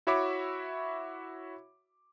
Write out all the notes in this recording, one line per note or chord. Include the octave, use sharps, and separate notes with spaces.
E4 F#4 C#5 E5 B5 D6